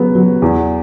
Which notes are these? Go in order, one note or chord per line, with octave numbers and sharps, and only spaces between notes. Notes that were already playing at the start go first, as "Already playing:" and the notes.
Already playing: C#3 F#3 B3
F#3
E2